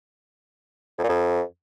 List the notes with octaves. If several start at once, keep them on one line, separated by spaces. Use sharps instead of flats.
F2
A#2
F2